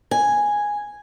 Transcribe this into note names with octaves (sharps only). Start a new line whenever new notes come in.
G#5